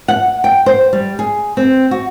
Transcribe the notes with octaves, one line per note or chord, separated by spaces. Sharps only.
F#5
G5
C5
G3
G#4
C4
F#4